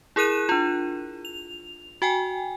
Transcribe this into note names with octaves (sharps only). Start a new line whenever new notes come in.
E4 G#4 A#4 F#6 D#7 E7
D4 F4
F7
F#4 G5 G#5